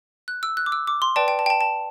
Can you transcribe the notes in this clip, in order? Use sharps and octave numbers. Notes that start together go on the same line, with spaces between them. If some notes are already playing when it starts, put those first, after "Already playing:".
F#6
E6
F#6
D6
E6
D6
C6
B4 D5 G5 A5
G5
A5
G5
A5
A5